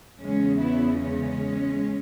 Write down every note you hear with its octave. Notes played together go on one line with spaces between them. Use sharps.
E2 C#3 E3 G#3 C#4
B3 E4
G#3 C#4